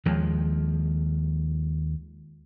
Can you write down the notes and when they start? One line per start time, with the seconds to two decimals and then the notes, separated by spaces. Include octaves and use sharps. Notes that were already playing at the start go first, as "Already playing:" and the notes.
0.06 D#2 F3 G#3